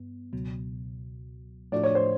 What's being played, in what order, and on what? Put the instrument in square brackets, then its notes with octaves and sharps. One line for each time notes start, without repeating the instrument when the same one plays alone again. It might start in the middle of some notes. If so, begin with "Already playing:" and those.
Already playing: [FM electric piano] G2 B3
C#2 B2 F#3
[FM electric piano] A2 F3 A3 D4 F#4 [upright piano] D5
[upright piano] C#5
C5